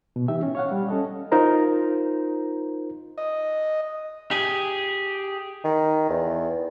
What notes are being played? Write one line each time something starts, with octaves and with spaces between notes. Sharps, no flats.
B2
E3 D#4 G4 E5
C#4
C#5 F5 F#5
G3
C#4 A4 D#5
D#4 F4 A#4 C5 A#5
D#5
G4 G#4
D#3
E2